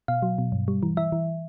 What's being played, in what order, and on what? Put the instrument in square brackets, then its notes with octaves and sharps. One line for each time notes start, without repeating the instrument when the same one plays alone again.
[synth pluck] B2 F5
F#3
B2
G2
G3
E3
E3 E5
E3